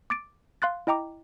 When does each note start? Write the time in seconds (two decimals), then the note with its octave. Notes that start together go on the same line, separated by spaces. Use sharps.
0.10 D6 A6 D7
0.62 F5 C6 F#6 A6
0.87 E4 D#5 G5 A#5 D6